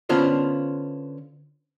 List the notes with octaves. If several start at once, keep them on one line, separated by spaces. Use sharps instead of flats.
D3 B3 C#4 D4 F4 C5